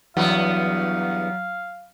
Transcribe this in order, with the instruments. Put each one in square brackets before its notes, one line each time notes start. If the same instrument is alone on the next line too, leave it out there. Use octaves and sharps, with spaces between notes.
[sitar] E2 G2 B3 [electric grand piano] F#3 [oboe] F5